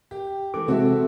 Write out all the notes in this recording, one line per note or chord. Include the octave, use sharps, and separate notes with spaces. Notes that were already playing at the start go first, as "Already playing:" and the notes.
G4
E3 A3 D6
C3 G#3 C4 F#4 A4 E5